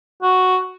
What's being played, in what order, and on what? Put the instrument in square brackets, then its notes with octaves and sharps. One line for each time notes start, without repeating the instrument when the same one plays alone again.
[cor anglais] F#4